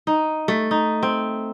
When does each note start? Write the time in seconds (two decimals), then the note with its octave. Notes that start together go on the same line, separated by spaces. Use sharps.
0.07 D#4
0.48 A3
0.71 D#4
1.03 C4